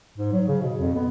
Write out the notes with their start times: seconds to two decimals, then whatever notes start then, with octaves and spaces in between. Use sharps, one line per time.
0.18 G#2
0.33 F#3
0.48 C#3
0.62 B2
0.79 F2
0.96 B3